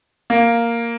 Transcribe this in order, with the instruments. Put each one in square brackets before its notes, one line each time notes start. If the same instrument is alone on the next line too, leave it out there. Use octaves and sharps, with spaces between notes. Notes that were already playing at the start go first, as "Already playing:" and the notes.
[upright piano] A#3